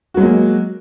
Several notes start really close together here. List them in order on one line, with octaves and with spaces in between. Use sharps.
F#4 F#3 G#3 A#3